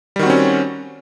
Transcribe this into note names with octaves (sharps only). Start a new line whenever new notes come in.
D#3 G3 C4 C#4 F#4